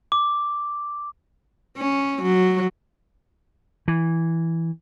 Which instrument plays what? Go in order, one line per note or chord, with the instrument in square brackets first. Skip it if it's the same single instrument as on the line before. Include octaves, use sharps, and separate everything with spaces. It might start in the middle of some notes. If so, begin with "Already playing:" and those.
[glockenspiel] D6
[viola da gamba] C#4
F#3
[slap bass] E3